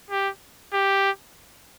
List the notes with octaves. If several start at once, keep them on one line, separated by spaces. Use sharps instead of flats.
G4
G4